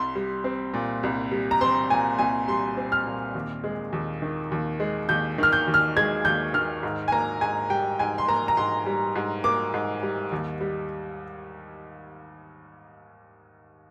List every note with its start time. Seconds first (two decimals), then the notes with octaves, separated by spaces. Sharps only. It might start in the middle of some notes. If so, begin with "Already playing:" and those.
Already playing: C2 C6
0.15 G3
0.44 C4
0.74 A#2
1.03 C2
1.31 G3
1.51 A#5
1.61 C4 C6
1.90 A#2 G#5
2.19 C2 G#5
2.48 G3 C6
2.77 C4
2.92 F6
3.06 A#2
3.35 D#2
3.64 G#3
3.93 D#2
4.22 D#3
4.52 D#2
4.80 G#3
5.09 D#2 G6
5.38 D#3 F6
5.53 G6
5.68 D#2
5.74 F6
5.97 G#3 G#6
6.25 D#2 G6
6.54 D#3 F6
6.83 G#2
7.08 G#5
7.12 A#3 A#5
7.41 G#2 G#5
7.70 G3 G5
7.99 G#2 G#5
8.18 C6
8.28 A#3 A#5
8.48 A#5
8.57 G#2 C6
8.86 G3
9.15 G#2
9.44 A#3 D6
9.74 G#2
10.03 G3
10.32 D#2
10.61 G3